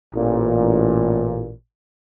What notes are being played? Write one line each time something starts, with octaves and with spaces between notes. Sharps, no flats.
A1 A#2